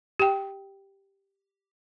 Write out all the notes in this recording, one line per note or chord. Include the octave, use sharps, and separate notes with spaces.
G4 G5